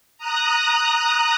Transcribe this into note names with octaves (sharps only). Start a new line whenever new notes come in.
A#5 D#6 F#6